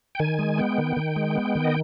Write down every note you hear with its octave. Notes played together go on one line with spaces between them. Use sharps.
G5
D#3 G#5
G#3
B3 G5
D#3
D#3
G#3
B3
D#3
D#5